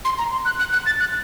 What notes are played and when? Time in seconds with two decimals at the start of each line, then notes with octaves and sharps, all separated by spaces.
0.05 C6
0.19 A#5
0.32 C6
0.45 F#6
0.59 F#6
0.72 F#6
0.86 A6
1.00 F#6